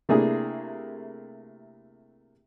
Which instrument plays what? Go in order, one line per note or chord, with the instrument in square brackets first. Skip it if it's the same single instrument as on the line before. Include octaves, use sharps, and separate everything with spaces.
[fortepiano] C3 A3 A#3 D4 E4 G#4